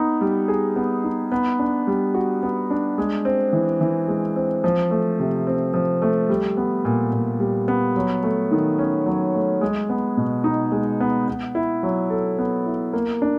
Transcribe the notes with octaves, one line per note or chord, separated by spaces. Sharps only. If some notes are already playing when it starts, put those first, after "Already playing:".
Already playing: B3 D#4
G3
G#4
B3
D#4
B3
D4
G3
F#4
B3
D4
G#3
C4
E3
E3
G#3
C4
F3
A3
C3
C4
F3
A3
G3
B3
A#2
A#2
G3
B3
F#3
A3
D#3
C#4
F#3
A3
G#3
B3
B2
D#4
G#3
B3
B3
E4
F#3
A4
B3
E4
A#3
D4